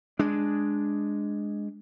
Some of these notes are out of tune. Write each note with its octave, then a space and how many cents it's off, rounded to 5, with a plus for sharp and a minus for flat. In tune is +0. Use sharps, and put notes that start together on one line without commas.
G#3 +0 D4 +0